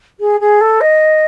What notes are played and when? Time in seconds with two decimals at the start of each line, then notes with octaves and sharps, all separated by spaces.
0.19 G#4
0.40 G#4
0.60 A4
0.80 D#5